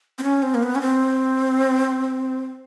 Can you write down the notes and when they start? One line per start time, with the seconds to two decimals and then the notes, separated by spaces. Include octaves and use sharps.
0.18 C4
0.23 C#4
0.43 C4
0.54 A#3
0.63 B3
0.75 C#4
0.81 C4